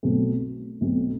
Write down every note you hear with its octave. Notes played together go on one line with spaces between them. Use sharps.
B1 B2 A3 C4
B1 B2 A3 C4